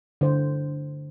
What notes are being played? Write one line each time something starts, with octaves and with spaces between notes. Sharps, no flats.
D3 C5